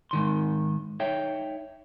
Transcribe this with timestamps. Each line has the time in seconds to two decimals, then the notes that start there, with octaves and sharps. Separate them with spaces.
0.11 G#2 D#3 C6
1.00 D#4 C#5 E5 G5